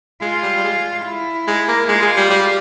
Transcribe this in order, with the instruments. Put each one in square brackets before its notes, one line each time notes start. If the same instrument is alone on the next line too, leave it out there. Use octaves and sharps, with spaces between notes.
[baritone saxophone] G#3 [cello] F4
[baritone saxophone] G3
G3
G#3
[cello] E4
[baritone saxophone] G#3
A#3
[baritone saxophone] G#3 [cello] F4
[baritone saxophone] G#3
G3
G3